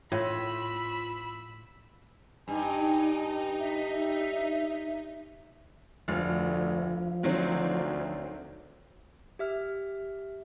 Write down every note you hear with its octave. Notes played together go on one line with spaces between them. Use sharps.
A2 F4 B5 E6
G2 D#4 G#5
E5
F1 D2 F3 F6
D2 D#3 F#3 C4
G4 E5 F6